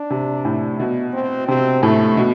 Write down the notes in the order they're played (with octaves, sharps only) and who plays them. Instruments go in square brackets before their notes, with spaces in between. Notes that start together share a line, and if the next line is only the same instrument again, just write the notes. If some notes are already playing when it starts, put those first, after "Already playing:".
Already playing: [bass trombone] D4
[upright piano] C3
A2
B2
[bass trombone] C4
[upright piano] C3 [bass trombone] C4
[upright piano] A2 [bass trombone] A3
[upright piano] B2